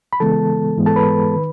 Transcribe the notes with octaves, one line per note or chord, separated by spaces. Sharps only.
B5
C#3 E3 G#3 B3 A4 A5
G#2 E3 G#3 B3
A4 A5
B4 B5
D#3